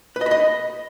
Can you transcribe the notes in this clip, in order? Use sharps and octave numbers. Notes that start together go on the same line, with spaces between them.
B4
D#5
B5
D#5